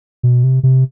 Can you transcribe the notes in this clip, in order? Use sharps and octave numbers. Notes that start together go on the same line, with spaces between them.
B2
C3
C3